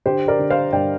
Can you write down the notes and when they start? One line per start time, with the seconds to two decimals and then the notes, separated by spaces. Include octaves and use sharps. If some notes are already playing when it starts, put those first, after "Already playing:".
0.06 D3 G4 C5
0.28 A#4 D5
0.39 D3
0.50 C5 F5
0.73 G2 D5 G5